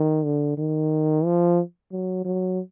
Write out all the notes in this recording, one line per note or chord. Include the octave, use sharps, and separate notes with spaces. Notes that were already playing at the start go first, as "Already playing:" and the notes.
Already playing: D#3
D3
D#3
F3
F#3
F#3